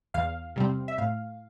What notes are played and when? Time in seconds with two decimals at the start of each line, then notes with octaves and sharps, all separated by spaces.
0.14 E2 F5
0.56 C3 G3 C4
0.88 E5
0.98 A2 F5